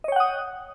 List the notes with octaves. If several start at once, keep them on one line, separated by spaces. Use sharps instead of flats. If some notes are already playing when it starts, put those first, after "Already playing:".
C#5 D#5 F#5 G5 D#6